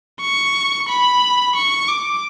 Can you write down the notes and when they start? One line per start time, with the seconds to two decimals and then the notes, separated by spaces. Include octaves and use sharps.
0.21 C#6
0.88 B5
1.56 C#6
1.88 D6